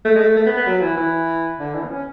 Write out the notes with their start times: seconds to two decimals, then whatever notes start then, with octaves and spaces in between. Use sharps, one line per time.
0.05 A3
0.15 G#3
0.20 A3
0.36 A3
0.46 B3
0.57 B3
0.67 F#3
0.82 E3
0.97 E3
1.60 D3
1.74 E3
1.84 B3
1.90 C#4